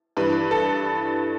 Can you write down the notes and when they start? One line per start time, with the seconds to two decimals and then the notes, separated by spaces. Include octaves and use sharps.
0.17 G2 E3 B4
0.51 A4